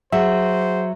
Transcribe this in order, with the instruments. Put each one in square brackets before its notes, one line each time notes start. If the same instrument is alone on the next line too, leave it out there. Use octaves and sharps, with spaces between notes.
[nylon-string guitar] F#3 [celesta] G#4 F#5 [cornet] C5 [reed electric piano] E5